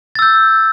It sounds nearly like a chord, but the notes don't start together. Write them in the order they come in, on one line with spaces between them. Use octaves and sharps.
A6 E6 G6